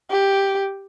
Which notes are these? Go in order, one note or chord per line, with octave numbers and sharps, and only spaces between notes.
G4